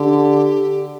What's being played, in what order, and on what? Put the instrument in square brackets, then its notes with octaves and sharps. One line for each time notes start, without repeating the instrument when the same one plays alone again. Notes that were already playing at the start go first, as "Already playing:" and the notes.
Already playing: [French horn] D3 [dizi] G4